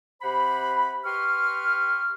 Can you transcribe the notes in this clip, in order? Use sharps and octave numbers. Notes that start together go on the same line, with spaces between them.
C3 C5 F#5 B5
G4 B4 C6 C#6 F6